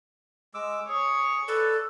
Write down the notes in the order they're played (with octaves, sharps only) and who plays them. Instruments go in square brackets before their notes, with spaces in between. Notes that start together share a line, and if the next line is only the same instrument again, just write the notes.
[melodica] G#3 D6 E6
[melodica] G#4 [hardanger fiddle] C#5
[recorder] A4 [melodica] B4 D5